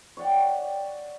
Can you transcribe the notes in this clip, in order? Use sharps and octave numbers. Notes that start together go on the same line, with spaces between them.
C#5 D5 F#5 G5